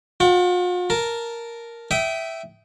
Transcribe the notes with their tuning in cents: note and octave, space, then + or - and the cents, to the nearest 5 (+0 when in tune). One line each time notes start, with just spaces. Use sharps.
F4 +45 F#5 +40
A#4 +0 A5 +0
E5 +0 G5 -25 D#6 +15